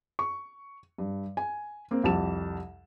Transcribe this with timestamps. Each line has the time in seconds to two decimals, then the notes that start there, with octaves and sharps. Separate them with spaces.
0.19 C#6
0.98 G2
1.37 G#5
1.91 A#3 C4
2.04 C2 F2 G4 A5 E7